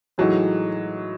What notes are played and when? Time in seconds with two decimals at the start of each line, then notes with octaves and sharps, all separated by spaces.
0.18 A2 E3 F#3 G#3 D#4